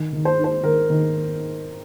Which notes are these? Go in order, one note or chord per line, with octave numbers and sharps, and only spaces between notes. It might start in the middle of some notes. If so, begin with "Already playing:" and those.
Already playing: D#3
D#3
C5
D#4
C5
D#3 A#4
D#3